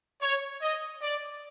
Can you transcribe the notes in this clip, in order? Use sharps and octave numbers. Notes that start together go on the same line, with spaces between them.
C#5
D#5
D5